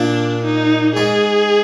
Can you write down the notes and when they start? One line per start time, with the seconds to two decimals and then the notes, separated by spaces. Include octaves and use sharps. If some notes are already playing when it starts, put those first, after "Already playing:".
Already playing: A#2 A#3 D4
0.45 D#4
0.96 G#2 G#3 G#4